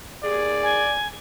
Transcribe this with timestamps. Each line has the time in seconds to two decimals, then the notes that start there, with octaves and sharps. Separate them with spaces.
0.24 D#2 G#4 D5
0.63 G#5